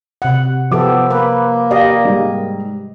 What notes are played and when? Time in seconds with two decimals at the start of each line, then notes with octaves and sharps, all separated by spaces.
0.22 C3 F#5
0.72 F3 B3 G4 A4 D6
1.10 A#3 B4
1.71 G4 D5 D#5 F5
2.05 G#2 G3